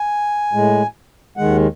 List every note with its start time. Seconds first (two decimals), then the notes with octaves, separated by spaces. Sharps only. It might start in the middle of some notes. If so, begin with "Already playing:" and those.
Already playing: G#5
0.53 A2 G#3
1.37 D#2 D#3 G#3 F#5